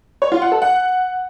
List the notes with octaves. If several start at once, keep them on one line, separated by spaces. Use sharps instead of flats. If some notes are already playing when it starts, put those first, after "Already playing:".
C#5
F4
F#5
A4
F#5